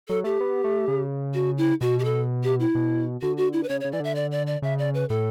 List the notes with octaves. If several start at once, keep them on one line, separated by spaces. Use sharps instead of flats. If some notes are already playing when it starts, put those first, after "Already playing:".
F#3 A4
A3 G4
B3
A3
C#3
F#4
E4
B2 F#4
G4
A4
G4
E4
B2
D3 F#4
F#4
E4
B4
C#3 C#5
C#5
C#3
E3 D5
D3 E5
D5
D5
D5
C#3 E5
D5
B4
A2 A4